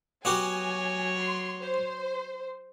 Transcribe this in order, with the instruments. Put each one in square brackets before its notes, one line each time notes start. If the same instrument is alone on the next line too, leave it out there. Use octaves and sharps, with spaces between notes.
[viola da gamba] F#3 C#5 [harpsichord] B3 F#4 G4 [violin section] G#5
[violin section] C6
C5